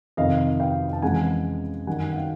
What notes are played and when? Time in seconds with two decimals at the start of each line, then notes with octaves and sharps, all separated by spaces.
0.17 F2 C3 D#3 D#5 F5
0.60 F5 G5
0.93 A5
1.02 F2 C#3 E3 G#3 F#5 G#5
1.87 F#2 D#3 G3 F#5 G#5
2.10 F#5
2.16 F5 G5